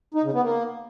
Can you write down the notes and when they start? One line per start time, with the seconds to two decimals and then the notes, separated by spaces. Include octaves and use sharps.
0.14 D#4
0.24 C#3
0.33 B3
0.43 A#3